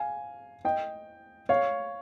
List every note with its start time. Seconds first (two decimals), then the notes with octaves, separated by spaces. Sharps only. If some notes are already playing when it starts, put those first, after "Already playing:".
Already playing: F5 G#5
0.65 D#5 G5
1.49 C#5 F5